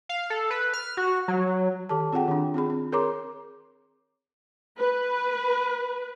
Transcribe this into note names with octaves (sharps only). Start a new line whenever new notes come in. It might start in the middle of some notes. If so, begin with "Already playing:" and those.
F5
A4
B4
F6
F#4
F#3
D#3 G4 A4 A5
C4 F4 G#4 F#5 G5
D#3 D4
C4 F4 G#4 B5
C4
G#4 A#4 C#5 A#5 C6 D6
B4